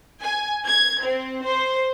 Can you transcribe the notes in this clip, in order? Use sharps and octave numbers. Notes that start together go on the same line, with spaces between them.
G#5
G#6
C4
C5